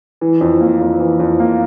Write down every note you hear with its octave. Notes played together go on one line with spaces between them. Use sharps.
E3
F2
A#3
F2
E3
F2
A#3